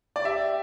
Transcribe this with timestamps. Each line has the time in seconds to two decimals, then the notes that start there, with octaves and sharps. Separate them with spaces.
0.16 D5
0.25 G4 E5